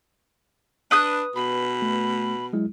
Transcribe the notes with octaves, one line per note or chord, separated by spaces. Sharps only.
D4 B4 D#6 F#6
B2 B5
A3
F#3 G#3 E4